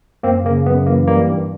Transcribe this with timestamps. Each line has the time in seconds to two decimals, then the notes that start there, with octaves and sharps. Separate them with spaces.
0.23 F#2 A#3 C4
0.44 C#3 A#3
0.66 F#2 B3
0.87 E3 A#3
1.07 G3 A#3
1.29 G2